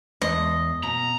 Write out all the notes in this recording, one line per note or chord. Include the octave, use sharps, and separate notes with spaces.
E2 G#3 D#5 A5 C6
B2 A#5